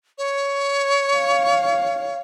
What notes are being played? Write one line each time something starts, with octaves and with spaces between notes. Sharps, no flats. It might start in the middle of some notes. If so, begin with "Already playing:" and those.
C#5
F5